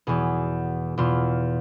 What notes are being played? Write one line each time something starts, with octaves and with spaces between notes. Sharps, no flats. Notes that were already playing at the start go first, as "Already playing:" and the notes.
E2 B2 G#4
E2 B2 F4